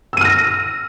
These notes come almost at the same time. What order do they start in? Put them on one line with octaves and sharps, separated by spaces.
E6 D#7 F6 A#6